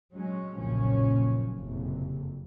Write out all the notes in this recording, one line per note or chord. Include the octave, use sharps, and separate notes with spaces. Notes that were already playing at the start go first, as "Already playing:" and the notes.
F#3 G#3 C#4
F#1 B1 F#2 A#2 F3 C#4
F#1 F2 C3